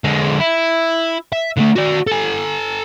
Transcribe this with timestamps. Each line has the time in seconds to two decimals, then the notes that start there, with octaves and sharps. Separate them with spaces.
0.04 D3 G#3
0.40 E4
1.32 E5
1.57 D3 A3
1.76 F#4 D5
2.07 A4 G#5